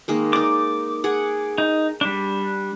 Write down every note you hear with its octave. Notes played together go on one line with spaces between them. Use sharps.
D#3 G#3 A#3
D#4 D5 D6
G#4 F#5
D#4
G3 D4